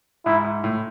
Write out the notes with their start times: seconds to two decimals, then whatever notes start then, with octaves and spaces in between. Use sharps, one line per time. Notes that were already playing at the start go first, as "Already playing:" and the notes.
0.25 G#2 E4
0.44 G#2
0.64 A2